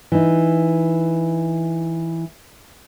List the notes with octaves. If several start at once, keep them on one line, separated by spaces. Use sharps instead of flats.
E3 D#4